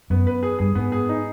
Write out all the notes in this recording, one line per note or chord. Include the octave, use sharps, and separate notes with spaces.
F#2 B3
B4
G#4
G2 G#4
G#2 B3
G#4
D#4